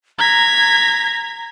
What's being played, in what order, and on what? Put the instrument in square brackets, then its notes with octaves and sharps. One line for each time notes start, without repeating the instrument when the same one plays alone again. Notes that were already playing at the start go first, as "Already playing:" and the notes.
[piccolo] A#5 [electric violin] G#6 B6